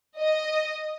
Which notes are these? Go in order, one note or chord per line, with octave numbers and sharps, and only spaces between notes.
D#5